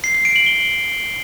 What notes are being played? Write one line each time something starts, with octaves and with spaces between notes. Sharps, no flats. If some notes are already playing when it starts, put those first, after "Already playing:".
C7
C7
D7
F#7
G7